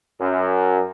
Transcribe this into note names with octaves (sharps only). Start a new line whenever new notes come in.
F#2